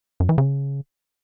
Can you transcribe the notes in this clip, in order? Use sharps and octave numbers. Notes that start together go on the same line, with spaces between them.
F#2
E3
C#3